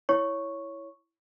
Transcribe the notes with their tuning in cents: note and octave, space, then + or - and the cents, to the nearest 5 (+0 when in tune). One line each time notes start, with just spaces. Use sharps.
E4 +0 C#5 +0 C#6 +0